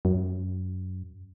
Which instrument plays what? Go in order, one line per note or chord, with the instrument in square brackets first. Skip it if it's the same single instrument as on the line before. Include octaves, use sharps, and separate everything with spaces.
[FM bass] F#2